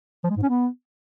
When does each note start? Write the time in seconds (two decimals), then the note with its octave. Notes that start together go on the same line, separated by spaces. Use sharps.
0.24 F3
0.30 G#3
0.37 G#2
0.43 C#4
0.49 B3